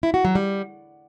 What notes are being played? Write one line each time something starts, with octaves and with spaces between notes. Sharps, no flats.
E4
F#4
F#3
G3